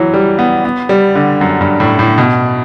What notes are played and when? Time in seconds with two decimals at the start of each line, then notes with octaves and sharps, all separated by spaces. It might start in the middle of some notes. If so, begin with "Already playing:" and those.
Already playing: E3 F#3
0.14 G3
0.39 B3
0.65 B3
0.89 G3
1.15 D3
1.41 F#2
1.61 G2
1.80 A2
1.99 A2
2.18 B2